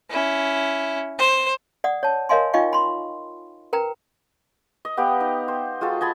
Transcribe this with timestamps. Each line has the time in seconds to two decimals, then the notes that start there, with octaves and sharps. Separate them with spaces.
0.10 C#4 E4
1.19 C5
1.84 D5 F#5 D#6
2.03 C#5 A5
2.29 A#4 C#5 D#5 F5 G#5 C6
2.54 D#4 F4 D#5 F5 G5 C#6
2.73 B5 C6
3.73 A#4 B4 G5 A#5
4.85 D#5
4.97 B3 G4 F5 G5
5.20 D#4
5.48 C5
5.81 G#3 F4 F#4 A4
6.01 D#5 G#5 A5 B5